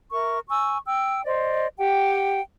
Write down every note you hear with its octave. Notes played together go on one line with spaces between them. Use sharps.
A#4 E5 C#6
G#5 C#6 E6
G5 E6
C5 D5 D#5
G4 F#5 G5